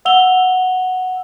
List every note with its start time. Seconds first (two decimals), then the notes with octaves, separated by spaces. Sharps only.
0.05 F5 F#5 E6 F7 G7